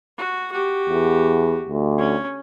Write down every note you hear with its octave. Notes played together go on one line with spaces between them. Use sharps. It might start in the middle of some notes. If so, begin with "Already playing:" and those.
F#4
F#4 G4
E2
D2
C#4